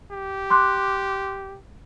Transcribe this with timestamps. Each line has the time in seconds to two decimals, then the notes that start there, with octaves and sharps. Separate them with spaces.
0.12 G4
0.50 C6 D6 F#6